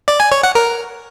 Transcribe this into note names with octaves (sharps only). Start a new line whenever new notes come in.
D5
G#5
C#5
F#5
A#4